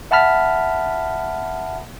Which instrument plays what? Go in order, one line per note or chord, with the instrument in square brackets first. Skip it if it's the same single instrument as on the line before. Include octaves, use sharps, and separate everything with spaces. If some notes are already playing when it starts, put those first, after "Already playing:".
[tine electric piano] E5 F#5 A5 B5 F6 B6